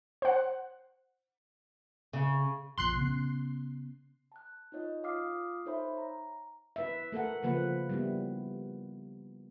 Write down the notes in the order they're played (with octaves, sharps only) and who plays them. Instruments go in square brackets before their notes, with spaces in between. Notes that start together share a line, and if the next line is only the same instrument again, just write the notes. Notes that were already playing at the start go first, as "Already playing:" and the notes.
[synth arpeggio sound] C5 F#5
[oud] C#3
[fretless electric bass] F1 A#1 F3 [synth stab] C6 F#6 C7
[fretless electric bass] C#3 B3 C#4
[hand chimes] A5 F#6
D#4 F4 C#5 D#5
F4 F5 D6 D#6 F6 C7
D#4 A4 C5 C#5 E5 B5
A#5
[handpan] E4 B4 E5
A3 A4 A#4 F#5
C#3 F3 A#3 B4 F#5
G3 B3 E4